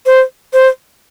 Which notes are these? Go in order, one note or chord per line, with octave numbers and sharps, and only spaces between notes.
C5
C5